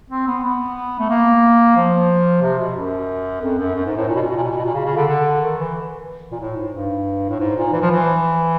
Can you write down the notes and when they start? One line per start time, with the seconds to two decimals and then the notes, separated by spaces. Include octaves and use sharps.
0.10 C4
0.27 B3
0.43 B3
0.99 A3
1.09 A#3
1.76 F3
2.42 C3
2.59 B2
2.76 F#2
3.41 F2
3.58 F#2
3.74 F#2
3.86 G#2
3.97 A2
4.08 A#2
4.15 B2
4.22 A#2
4.29 B2
4.36 A#2
4.43 B2
4.51 A#2
4.57 B2
4.65 A#2
4.74 C#3
4.85 C#3
4.96 D3
5.08 D3
5.41 D#3
5.57 E3
6.32 A#2
6.40 A2
6.56 G#2
6.73 G2
7.29 A2
7.40 G#2
7.56 A#2
7.73 E3
7.81 F3
7.91 E3